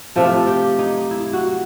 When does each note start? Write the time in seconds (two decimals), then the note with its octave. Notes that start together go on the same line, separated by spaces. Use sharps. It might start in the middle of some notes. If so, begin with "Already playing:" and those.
0.16 C3 F3 A3 A4
0.47 G4
0.79 D#4
1.11 E4
1.33 F#4